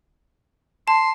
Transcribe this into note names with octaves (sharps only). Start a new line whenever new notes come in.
A5 C6